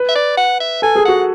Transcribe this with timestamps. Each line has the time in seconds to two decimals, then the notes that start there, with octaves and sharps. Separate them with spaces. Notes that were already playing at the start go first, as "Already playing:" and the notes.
Already playing: B4
0.08 E5
0.15 D5
0.37 F#5
0.60 E5
0.82 A4 G#5
0.95 G#4
1.05 F#4 F#5